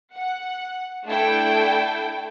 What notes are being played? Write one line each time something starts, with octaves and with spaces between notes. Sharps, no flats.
F#5
A3 D4 E4 A4 G5